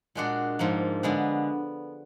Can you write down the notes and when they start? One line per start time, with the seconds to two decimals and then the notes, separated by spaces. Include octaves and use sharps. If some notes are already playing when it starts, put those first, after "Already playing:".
0.15 A#2 G#3 D4 F#4
0.59 G#2 F3 A#3
1.03 D3 G#3 B3